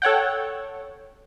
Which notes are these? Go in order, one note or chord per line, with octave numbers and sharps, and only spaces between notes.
A4 C#5 F#5 G5